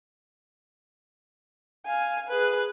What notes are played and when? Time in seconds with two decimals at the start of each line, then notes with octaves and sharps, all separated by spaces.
1.86 F5 G#5
2.29 G#4 B4